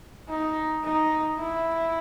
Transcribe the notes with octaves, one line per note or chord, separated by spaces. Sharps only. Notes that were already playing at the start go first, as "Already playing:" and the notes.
D#4
D#4
E4